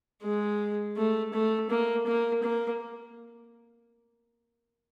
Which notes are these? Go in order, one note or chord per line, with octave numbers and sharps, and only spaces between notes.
G#3
A3
A3
A#3
A#3
A#3